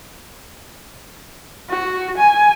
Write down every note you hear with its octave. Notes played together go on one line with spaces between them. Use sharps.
F#4
G#5